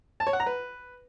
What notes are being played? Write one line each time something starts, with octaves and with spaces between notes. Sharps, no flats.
A5
C#5
F#5
A#5
B4